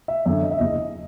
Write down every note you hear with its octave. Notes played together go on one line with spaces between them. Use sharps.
E5
F#2 D3 E5
D#5
E5
F#1 D#5